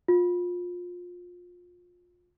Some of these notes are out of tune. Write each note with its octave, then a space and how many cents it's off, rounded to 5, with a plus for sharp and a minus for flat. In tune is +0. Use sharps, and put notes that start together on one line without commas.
F4 +25